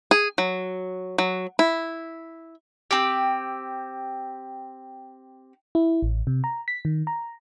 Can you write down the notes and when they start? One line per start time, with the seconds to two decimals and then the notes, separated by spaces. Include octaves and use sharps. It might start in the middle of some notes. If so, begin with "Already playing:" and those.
0.11 G#4
0.38 F#3
1.18 F#3
1.59 E4
2.91 C4 G4
5.75 E4
6.02 A1
6.27 C3
6.44 A#5
6.68 B6
6.85 D#3
7.07 A#5